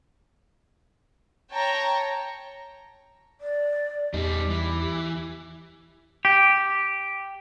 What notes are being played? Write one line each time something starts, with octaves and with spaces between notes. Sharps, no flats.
C#5 G5 A5 A#5
D5
E2 G3 D#4 G4
E3
G4